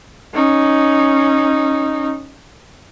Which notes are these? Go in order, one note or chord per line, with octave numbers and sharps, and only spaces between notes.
C#4 D#4